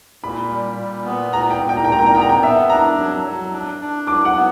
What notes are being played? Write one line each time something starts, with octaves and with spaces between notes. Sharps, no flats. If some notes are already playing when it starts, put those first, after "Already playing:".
A#2 B5
G3
A#2
B3
A#2 A#5
G5
A#2
G5
A#5
G5
A#2 A#5
G5
A#5
B3 G5
A#5
G5
B3 E5
D4 A#5
F#3
F#3
D4
D4
F#3 D6
F#5
B3